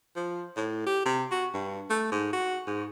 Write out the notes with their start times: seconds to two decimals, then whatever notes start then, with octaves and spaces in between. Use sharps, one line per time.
0.16 F3
0.57 A2
0.87 G4
1.06 C3
1.31 F#4
1.54 G2
1.90 A3
2.12 G#2
2.33 F#4
2.67 G#2